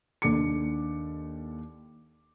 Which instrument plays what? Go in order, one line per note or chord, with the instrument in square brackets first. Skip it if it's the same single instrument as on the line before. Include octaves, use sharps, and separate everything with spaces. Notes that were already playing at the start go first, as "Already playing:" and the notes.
[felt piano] D#2 D4 A4 D6 C#7